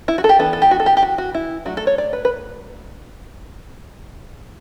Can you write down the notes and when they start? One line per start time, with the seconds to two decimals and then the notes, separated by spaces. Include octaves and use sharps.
0.08 E4
0.18 F#4
0.24 A4
0.29 G4
0.39 E3 B3 D4 A4
0.53 A4
0.62 G4
0.71 F#4
0.80 A4
0.86 G4
0.97 G4
1.02 F#4
1.18 F#4
1.34 E4
1.65 F#3 A3 D4 F#4
1.77 A4
1.87 C#5
1.98 D5
2.13 B4
2.25 B4